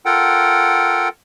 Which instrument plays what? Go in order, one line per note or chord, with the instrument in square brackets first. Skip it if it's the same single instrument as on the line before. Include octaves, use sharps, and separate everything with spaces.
[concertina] F4 A4 A#4 F#5 G5